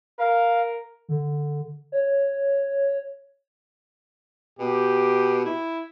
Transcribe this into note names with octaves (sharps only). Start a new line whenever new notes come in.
A#4 F5
D3
C#5
B2 G4
E4